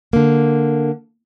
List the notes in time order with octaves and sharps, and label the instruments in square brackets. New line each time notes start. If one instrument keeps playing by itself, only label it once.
[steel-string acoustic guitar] D3 A#3